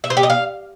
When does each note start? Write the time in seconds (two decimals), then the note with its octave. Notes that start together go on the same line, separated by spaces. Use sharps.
0.04 E5
0.10 C5
0.17 G4
0.23 D#5
0.30 F5